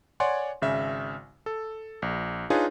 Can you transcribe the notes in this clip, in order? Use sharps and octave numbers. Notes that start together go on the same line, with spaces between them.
C#5 D5 F#5 G#5 C6
G#1 C#3 E5
A4
A#1
D4 D#4 F4 G#4 B4 C#5